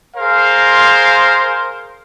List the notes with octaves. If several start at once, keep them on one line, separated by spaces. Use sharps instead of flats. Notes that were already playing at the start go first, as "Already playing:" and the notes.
G#4 A#4 C5 F5